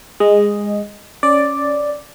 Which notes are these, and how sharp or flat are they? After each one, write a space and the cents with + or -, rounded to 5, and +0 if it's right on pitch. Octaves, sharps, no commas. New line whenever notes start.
G#3 -15 D#5 +0
C#4 +0 D5 +0